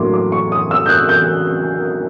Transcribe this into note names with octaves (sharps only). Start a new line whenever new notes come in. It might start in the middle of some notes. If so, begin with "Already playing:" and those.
Already playing: A2 F#3 A#3 D4 C6 D6
D6
C#6
D#6
E6
G6
F#6
G6